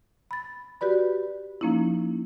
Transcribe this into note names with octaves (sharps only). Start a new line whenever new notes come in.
B5 A6
F#4 G4 B4 D5 B5
F3 A#3 C#4 D#4 E4